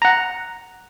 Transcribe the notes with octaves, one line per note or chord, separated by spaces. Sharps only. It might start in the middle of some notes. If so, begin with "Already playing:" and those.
F#5 A#5